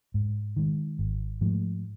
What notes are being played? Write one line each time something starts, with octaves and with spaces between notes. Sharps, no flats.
G#2
D#3 G#3
G#1
G#2 F3 A3